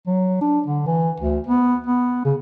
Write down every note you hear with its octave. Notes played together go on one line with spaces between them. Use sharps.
F#3
D4
D3
E3
D2
B3
B3
C#3